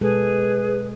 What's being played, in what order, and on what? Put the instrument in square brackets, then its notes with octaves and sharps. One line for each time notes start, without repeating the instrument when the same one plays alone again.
[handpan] B2 G#3 A4 [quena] G#4 [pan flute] B4